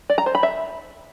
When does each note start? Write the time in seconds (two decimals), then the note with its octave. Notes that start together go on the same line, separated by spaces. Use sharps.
0.10 D5
0.18 A#5
0.26 C5
0.35 B5
0.43 E5